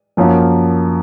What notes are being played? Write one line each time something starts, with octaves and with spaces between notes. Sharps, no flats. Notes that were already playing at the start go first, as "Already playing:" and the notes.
F#2 F3 A#3